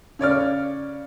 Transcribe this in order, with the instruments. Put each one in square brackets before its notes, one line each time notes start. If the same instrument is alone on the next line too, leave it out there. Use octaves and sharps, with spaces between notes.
[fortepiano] C#3 C#5 D5 F6